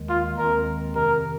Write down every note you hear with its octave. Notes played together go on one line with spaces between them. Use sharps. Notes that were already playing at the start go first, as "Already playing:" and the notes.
Already playing: D#2 D#3 G#3
F4
D#2 D#3 G#3 C4 A#4
F2 C3 D#3 A#4